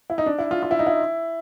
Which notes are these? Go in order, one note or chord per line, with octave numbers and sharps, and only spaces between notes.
E4
D#4
D4
E4
F4
F4
E4
D#4
E4